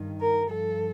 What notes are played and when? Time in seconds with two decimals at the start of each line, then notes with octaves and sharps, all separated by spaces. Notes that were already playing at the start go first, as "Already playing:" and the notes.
Already playing: G2 D#3
0.20 A#4
0.50 G2 F3 A4